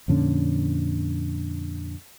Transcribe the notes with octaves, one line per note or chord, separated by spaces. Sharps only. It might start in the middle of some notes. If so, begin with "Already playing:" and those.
F2 A#2 D3 C#4